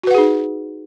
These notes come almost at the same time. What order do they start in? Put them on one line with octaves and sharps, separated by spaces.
F#4 B4 F#5 G#4 D#4